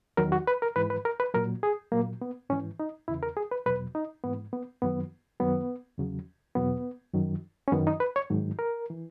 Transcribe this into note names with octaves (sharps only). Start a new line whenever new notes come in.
E2 D#3 F#3 A#4
F#4
B4
A#4
G#2 E3 B4
B4
A#4
B4
A#2 F#3 A#4
G#4
A#2 F#3 A#3
B3
G#2 E3 C#4
D#4
E2 C#3 E3 E4
A#4
G#4
B4
E2 B2 F#3 B4
D#4
G#2 E3 B3
B3
F#2 D#3 F#3 B3
F#2 D#3 F#3 B3
E2 C#3 F#3
E2 B2 F#3 B3
F#2 D#3 F#3
C#4
F#2 D#3 F#3 B3
D#4
B4
C#5
G#2 D#3 F#3
A#4
E3